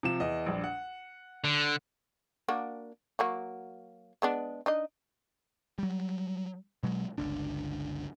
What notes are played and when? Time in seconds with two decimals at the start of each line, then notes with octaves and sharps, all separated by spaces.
0.03 C3 F3 E7
0.20 E2 D#5
0.46 A#1 G3 D4
0.64 F#5
1.44 D3
2.48 A#3 D4 F#4
3.19 F#3 A#3 F#4
4.22 G#3 B3 D4
4.66 D4 D#4 D#5
5.78 F#3 G3
6.83 B2 F#3 G#3
7.18 G1 C#2 D3 D4